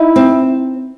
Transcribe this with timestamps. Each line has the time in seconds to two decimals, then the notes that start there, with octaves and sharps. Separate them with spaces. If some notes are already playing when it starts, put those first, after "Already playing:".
Already playing: D#4 E4
0.16 C4